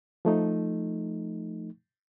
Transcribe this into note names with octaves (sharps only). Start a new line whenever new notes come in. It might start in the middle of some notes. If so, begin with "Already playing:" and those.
F3 A3 D#4